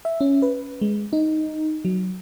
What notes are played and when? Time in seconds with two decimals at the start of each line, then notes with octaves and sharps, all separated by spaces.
0.05 E5
0.21 C#4
0.42 B4
0.81 G#3
1.13 D#4
1.85 F#3